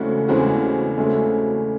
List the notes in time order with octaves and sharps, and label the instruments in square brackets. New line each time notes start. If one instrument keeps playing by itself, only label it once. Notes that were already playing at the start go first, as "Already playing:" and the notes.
Already playing: [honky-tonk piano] E2 C#3 G#3 C4 F#4 [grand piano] A3
[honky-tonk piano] E2 C#3 G#3 C4 F#4
[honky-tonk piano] C#3 G#3 C4 F#4 [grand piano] A3